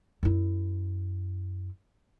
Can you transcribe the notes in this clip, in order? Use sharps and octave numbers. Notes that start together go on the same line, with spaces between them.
F#2 E4